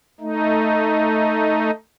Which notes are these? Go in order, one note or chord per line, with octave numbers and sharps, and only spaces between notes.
A3 D#4